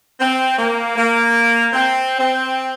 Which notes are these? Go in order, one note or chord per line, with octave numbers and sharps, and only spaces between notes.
C4
A#3
A#3
C4
C4